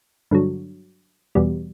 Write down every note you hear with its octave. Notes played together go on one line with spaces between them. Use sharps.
G2 D3 F#3
E2 B2 G3